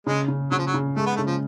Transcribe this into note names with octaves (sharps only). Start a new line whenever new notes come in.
C#3 G#3
C#3
C#3 F#3
F3
F#3
C#3
G#3 A3
B3
A3
C#3
F3